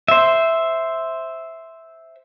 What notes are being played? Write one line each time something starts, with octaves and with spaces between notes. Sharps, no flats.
C5 E5